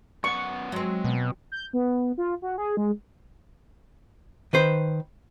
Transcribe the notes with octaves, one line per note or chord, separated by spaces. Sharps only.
F#2 B3 D5 F#5 C#6
F#3 G#3 C4
B2
G6
B3
F4
F#4
G#4
G#3
D#3 B4 C5